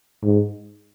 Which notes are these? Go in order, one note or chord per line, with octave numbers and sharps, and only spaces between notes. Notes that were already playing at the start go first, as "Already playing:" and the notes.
G#2